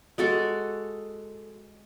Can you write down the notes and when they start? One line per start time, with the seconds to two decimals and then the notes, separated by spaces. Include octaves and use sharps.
0.18 G#3 F#4 A4